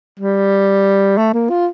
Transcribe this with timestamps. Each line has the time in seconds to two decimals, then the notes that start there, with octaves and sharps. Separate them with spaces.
0.20 G3
1.17 A3
1.33 A#3
1.50 F4